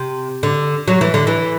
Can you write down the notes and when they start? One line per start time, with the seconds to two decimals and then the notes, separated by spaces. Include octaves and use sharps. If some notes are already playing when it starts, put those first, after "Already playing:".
Already playing: C3
0.43 D3
0.88 F#3
1.01 E3
1.14 D3
1.27 E3